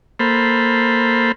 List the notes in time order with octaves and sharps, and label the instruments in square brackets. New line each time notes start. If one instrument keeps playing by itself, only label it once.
[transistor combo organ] A#3 A4 C5 B5